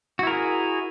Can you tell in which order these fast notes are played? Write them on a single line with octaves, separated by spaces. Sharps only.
F#4 E4 A#4 G#4